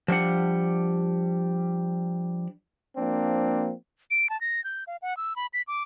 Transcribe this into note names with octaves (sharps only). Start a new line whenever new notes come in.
F3 G3 D4 F#5
F3 A#3 C4 D4
D7
A5
A#6
G6
F5
F#5
E6
B5
B6
D6